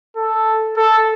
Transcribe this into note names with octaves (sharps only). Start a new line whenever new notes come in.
A4
A4